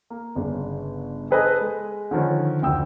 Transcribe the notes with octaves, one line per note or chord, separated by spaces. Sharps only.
A#3
G1 C#3 D4
G#4 A4 B4 C5 D#5 G#5
G#3
D3 D#3 F3 C#4
F#1 D2 G5 E6